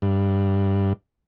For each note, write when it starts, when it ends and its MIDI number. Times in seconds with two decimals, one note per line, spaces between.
0.02 0.93 43